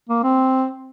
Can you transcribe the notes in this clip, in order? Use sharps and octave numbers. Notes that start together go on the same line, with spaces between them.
A#3
C4